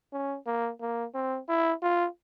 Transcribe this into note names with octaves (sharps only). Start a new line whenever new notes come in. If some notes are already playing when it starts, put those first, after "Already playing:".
C#4
A#3
A#3
C4
E4
F4